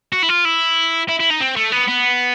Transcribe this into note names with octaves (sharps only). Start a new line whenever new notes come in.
F#4
E4
F4
E4
E4
E4
D#4
C4
A3
B3
B3